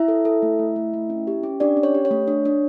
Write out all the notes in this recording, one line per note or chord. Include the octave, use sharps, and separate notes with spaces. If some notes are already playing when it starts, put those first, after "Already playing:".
Already playing: E4 E5
A4
A4
A3
A3
A3
A3
C#4
G4
C#4
D4 G4 D5
C#4
C#5
G4
C#5
A3
D4
D4